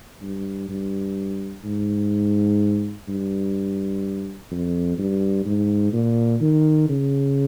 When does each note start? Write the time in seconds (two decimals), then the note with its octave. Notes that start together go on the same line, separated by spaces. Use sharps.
0.22 G2
0.69 G2
1.64 G#2
3.08 G2
4.51 F2
4.98 G2
5.46 G#2
5.93 A#2
6.41 D#3
6.89 C#3